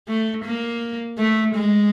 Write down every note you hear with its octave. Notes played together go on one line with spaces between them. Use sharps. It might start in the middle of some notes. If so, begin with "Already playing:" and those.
A3
A#3
A3
G#3